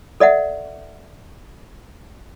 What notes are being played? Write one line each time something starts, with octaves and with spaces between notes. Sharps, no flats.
A4 D5 E5 F#5